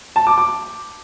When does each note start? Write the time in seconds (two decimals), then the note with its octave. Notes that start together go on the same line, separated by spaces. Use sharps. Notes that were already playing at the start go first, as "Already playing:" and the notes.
0.16 A5
0.27 D6
0.38 D6